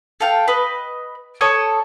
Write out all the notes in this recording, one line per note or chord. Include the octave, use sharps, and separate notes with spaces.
A4 F5 G5
B4 D#5
A4 C#5 D#6